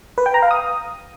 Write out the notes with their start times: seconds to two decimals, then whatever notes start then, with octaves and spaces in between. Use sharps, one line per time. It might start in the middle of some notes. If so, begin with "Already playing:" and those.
0.18 B4
0.26 G5
0.34 A#5
0.42 F5
0.51 D#6